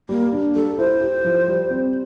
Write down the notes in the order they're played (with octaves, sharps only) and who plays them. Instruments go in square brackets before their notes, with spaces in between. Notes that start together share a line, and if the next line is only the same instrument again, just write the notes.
[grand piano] G3 [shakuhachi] A#3
[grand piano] D4
[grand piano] G3 [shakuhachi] A4
[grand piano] E4 [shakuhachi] C5
[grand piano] G4
F3
G3
C4